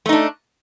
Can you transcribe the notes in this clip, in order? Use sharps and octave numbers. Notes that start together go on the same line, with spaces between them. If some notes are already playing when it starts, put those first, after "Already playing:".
A3 D4 D#4